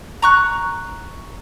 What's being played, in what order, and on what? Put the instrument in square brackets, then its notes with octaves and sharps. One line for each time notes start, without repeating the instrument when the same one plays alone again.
[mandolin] A#5 C#6 F#6